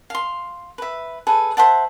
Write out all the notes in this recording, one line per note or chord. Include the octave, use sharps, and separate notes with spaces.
F5 C6
B4 E5
G#4 A4 B4
C5 E5 F#5 A5